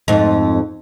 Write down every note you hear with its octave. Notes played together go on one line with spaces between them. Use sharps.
F2 G#2